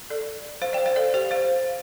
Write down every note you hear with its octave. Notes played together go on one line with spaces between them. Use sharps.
A4 D5
C5 F5
D5 G5
C5 F5
A4 D5
G4 C5
C5 F5